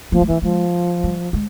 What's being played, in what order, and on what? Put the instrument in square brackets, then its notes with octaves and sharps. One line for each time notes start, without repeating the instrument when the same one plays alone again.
[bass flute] F3 [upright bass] A#3
[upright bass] G#3
[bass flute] E3 [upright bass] A#3
[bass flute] F3 [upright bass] G#3
[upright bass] G3
G#3